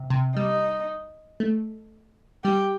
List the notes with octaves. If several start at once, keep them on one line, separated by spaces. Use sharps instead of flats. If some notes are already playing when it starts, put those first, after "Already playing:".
Already playing: C3
C3
G3 D#4
A3
G3 G4